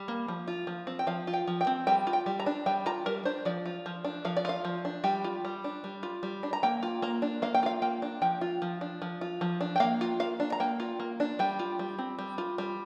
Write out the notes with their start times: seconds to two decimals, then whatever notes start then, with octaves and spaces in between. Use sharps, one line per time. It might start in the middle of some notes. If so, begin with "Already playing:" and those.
Already playing: G3
0.08 A#3
0.28 F3
0.47 F4
0.67 F3
0.87 C4
0.99 G5
1.07 F3 F5
1.27 F4
1.34 G5
1.47 F3
1.61 G5
1.67 C4
1.87 G3 G5
2.07 F4
2.13 G5
2.26 G3
2.40 A#5
2.46 D4
2.66 G3 G5
2.86 F4 A#5
3.06 G3 A#4
3.25 D4 C5
3.45 F3 D5
3.66 F4
3.86 F3
4.05 D4
4.25 F3 F5
4.37 D5
4.45 F4 F5
4.65 F3
4.85 D4
5.04 G3 G5
5.24 F4
5.45 G3
5.64 D4
5.84 G3
6.03 F4
6.23 G3
6.43 D4
6.53 A#5
6.63 A#3 G5
6.83 F4
7.02 A#3 A#5
7.22 D4
7.42 A#3 F5
7.54 G5
7.63 F4 F5
7.82 A#3 G5
8.02 D4
8.22 F3 G5
8.41 F4
8.62 F3
8.81 D4
9.02 F3
9.21 F4
9.41 F3
9.61 D4
9.76 G5
9.80 A#3 F5
10.01 F4
10.20 A#3 F5
10.40 D4
10.52 A#5
10.60 A#3 G5
10.80 F4
11.00 A#3
11.20 D4
11.39 G3 G5
11.59 F4
11.79 G3
11.99 C4
12.19 G3
12.38 F4
12.58 G3